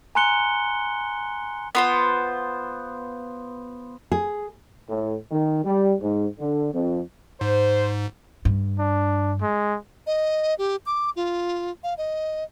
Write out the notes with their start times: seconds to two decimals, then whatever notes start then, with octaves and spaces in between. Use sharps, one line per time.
0.15 G#5 A#5 C6 F#6 C#7 G7
1.75 B3 F4 C5
4.12 G#4
4.89 A2
5.31 D#3
5.65 G3
6.01 G#2
6.39 D3
6.73 F2
7.41 G#2 C5
8.45 G2
8.79 D4
9.42 G#3
10.07 D#5
10.59 G4
10.86 D6
11.16 F4
11.83 F5
11.98 D#5